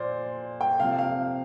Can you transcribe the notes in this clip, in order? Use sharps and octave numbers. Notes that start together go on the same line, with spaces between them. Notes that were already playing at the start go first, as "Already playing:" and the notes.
Already playing: A#2 F3 C5 D5
G5
C3 F3 F5
F5